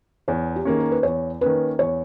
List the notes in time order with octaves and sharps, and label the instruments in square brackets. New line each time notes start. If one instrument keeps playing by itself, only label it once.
[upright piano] E2 [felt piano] C#5
[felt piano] G4
[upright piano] D#3 A#3 C#4 [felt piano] G#4
[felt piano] A#4
B4
[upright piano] E2 [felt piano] C#5
[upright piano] D#3 A#3 C#4 [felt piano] B4
[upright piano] E2 [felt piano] C#5